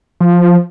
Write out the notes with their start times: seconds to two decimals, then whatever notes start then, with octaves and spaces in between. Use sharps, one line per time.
0.20 F3